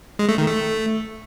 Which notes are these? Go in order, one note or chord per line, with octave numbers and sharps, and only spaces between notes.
G#3
A3
D#3
A3